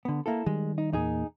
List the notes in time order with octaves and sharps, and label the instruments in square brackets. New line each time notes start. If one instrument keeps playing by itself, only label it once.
[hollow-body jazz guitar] D3 B3
A#3 E4 A4
[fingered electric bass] D#3 G3 [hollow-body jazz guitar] G#3
[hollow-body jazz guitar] D#4
[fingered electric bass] E2 A#2 A#3 [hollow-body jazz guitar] D#4 G#4